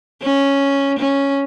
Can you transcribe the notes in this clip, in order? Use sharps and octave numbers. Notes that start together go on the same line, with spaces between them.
C#4
C#4